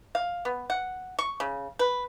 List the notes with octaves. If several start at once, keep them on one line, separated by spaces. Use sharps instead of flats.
F5
B3
F#5
C#6
C#3
B4